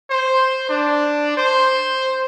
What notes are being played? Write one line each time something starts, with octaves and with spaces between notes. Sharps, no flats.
C5
D4
C5